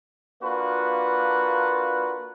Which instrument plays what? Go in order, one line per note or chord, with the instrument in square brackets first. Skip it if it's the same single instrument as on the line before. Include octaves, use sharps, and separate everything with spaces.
[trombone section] A#3 D4 F4 F#4 B4